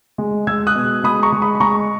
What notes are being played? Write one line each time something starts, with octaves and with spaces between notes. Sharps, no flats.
G#3
G#3 E6 G#6
D#6 F#6
B2
G#3 B5 D#6
A#5 C#6
G#3
B5 D#6
B5
G#3 A#5 C#6